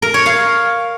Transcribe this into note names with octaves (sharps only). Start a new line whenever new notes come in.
A#4
C#5
F5